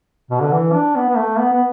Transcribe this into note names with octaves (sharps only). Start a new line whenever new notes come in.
B2
D3
E3
D4
B3
B3
A3
B3
B3